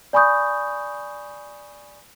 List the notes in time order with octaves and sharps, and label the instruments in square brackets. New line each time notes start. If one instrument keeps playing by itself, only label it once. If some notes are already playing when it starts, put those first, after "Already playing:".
[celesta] D5 G#5 B5 C#6 D#6 G6